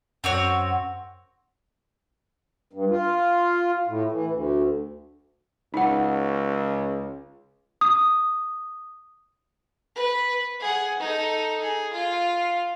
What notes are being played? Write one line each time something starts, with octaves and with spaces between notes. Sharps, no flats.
F#2 C4 F#4 C#5
G2
F4
A2
E3
D2
C#2 D#4 F#5
D#6
B4
G#4 F#5
D#4 A4
G#4
F4